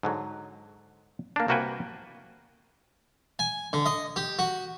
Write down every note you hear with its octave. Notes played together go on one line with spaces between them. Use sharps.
G#2 D3 F#3
A#3 D4
C2 A#3 F#4 B4 G5 G#5
G#5
D3
D#5
G4
F#4